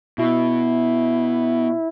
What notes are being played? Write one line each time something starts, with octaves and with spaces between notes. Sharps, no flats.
B2 E4